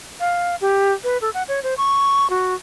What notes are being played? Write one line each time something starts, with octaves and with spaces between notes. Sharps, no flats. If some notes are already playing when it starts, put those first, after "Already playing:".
F5
G4
B4
A4
F#5
C#5
C5
C#6
F#4